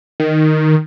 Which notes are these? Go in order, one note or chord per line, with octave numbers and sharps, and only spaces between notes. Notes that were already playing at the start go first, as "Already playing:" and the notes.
D#3